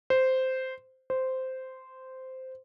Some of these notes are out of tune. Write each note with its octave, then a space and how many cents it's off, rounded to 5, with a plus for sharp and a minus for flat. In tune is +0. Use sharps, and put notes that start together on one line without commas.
C5 -10
C5 -10